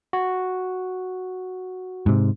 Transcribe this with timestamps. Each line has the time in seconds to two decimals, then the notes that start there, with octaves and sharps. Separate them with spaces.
0.13 F#4
2.06 G#2 C3